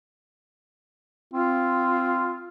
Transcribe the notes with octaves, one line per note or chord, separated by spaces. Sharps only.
C4 F4